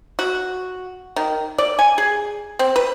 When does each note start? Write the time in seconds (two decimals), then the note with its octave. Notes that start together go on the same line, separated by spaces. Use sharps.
0.19 F#4
1.16 D#3
1.58 D5
1.79 G#5
1.98 G#4
2.59 C4
2.76 B4